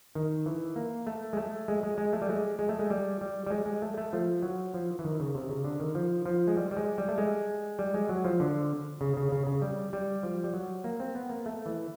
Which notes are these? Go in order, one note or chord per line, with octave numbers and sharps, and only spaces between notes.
D#3
E3
A#3
A3
G#3
A3
G#3
G#3
G#3
A3
G3
G#3
G#3
A3
G#3
G3
G3
G3
G#3
G#3
A3
A3
F3
F#3
F3
E3
D#3
C#3
C3
C#3
D3
D#3
F3
F3
G#3
G3
G3
G#3
G3
A3
G#3
G3
G#3
F#3
F3
D3
C#3
C#3
C#3
C#3
G3
G3
F3
G3
F#3
A#3
C4
B3
A#3
A3
E3